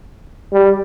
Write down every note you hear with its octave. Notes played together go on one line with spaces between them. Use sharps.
G3